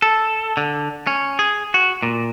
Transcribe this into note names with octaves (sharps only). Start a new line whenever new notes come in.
A4
D3
C#4
G#4
F#4
A#2